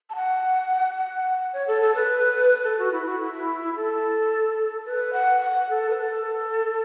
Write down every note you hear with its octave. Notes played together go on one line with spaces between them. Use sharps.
A5
F#5
F#5
C#5
A4
A4
B4
A4
F#4
E4
F#4
E4
A4
B4
F#5
F#5
A4
B4
A4